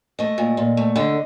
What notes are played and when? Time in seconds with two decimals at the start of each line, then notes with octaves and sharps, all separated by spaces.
0.19 A3 D#5
0.38 A#2
0.57 A#2
0.77 A3
0.96 D3 D#5